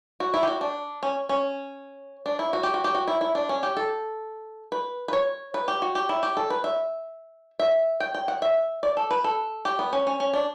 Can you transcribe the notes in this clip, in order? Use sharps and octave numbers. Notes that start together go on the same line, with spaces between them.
F#4
E4
G4
F#4
D4
C#4
C#4
D4
E4
F#4
G4
F#4
G4
F#4
E4
E4
D4
C#4
G4
A4
B4
B4
C#5
B4
G4
F#4
G4
E4
G4
A4
B4
E5
E5
G5
G5
F#5
E5
D5
A4
B4
A4
G4
B3
C#4
C#4
C#4
D4